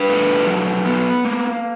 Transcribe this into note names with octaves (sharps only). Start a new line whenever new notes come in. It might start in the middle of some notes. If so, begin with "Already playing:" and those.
Already playing: D4 B4
A3
F#3
B3
A#3